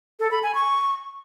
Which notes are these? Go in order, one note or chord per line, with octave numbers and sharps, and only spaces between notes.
A4
B5
G#5
C#6